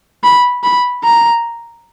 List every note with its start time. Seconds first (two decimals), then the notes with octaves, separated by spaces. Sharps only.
0.24 B5
0.64 B5
1.04 A#5